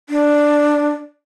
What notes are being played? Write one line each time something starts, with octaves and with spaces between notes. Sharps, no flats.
D4